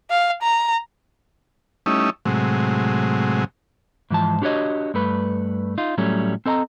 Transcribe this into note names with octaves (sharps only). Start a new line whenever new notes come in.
F5
A#5
G3 A3 C#4 D#4 E4
A2 C3 F#3 G#3
G#2 E3 F3 A5
D4 F#4 G4 B4 C#5 D#5
G2 A3 B4
D#4 F4
A2 F#3 G3 A3 C#4
C4 A4 D#5 A5 A#5